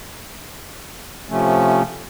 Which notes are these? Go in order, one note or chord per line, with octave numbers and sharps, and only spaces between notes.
C3 F3 A3 C#4